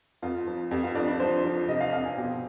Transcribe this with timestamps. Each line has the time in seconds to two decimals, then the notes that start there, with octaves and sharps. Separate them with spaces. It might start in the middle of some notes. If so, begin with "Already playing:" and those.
0.22 F2 F4
0.47 F3
0.71 F2 G4
0.83 F4
0.95 F2 D4
1.08 D4
1.20 F3 C5
1.44 F3
1.68 C3 D#5
1.81 F5
1.93 F2 F5
2.05 G#5
2.17 B2 G5